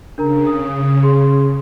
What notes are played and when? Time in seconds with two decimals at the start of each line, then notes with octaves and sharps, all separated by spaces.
0.18 C#3 D4 A#4 A#5
0.47 D#6
1.03 G#4 C6